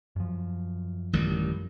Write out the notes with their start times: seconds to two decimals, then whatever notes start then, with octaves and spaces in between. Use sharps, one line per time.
0.16 F#2 F3
1.13 A1 D#3 G3